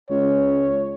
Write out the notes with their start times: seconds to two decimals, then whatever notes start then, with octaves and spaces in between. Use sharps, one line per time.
0.10 C#2 C#5